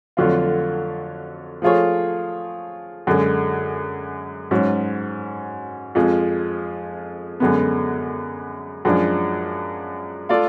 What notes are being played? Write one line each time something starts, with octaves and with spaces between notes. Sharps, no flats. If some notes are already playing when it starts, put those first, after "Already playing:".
F2 D3 F#3 A3 F4
F3 A3 F4 G#4 C#5
F#2 D3 G#3
G#2 F#3 C#4
F2 F3 G#3
F#2 D3 G#3 B3
F#2 F3 G#3 D4
A3 F4 A4 D5